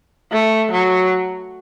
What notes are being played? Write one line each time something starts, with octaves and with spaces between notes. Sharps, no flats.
A3
F#3